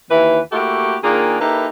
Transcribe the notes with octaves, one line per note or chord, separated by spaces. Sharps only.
D#2 E3 B4
A3 A#3 E4 F#4 G4 A4
D#3 A#3 D4 F4 G#4
A#3 D#4 E4 G4 A4 B4